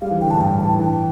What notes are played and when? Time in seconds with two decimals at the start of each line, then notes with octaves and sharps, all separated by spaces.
0.01 G3 F5
0.11 E3
0.21 D3 G5
0.31 A2 A5
0.40 G2 G5
0.59 E3 A5
0.79 E3 G5